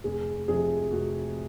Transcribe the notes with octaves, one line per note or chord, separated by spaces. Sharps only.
F1 G#4
F2 C3 F3 G#4
F1 F#4